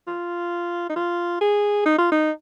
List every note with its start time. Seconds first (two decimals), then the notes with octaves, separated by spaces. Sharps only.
0.07 F4
0.89 D#4
0.96 F4
1.41 G#4
1.86 D#4
1.98 F4
2.12 D#4